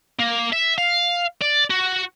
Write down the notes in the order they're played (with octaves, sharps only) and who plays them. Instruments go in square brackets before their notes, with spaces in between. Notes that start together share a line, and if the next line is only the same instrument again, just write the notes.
[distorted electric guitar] A#3
E5
F5
D5
F#4